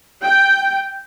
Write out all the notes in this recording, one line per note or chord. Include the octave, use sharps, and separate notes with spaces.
G5